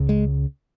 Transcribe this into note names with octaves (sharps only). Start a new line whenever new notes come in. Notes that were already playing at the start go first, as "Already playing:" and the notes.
Already playing: C#2 C#3
G#3